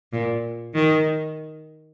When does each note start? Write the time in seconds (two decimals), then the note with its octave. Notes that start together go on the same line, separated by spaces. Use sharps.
0.13 A#2
0.74 D#3